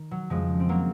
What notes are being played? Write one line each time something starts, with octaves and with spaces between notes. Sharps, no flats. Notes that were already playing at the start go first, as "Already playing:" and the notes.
Already playing: D#3
F#3
F2 C#3 F3 G#3
C4
F#3 A#3